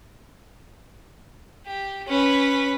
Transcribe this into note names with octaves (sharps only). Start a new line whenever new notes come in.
G4
C#4 B4